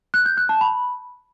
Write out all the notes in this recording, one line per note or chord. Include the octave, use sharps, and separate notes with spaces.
F#6
G6
F#6
A5
B5